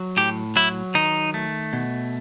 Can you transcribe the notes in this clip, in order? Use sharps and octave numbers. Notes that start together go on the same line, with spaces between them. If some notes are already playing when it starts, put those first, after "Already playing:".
Already playing: F#3
A2 G4
F#3 E4
D#3 D#4
A3
B2